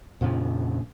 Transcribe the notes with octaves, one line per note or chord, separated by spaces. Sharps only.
F2 A#2 C#3 F3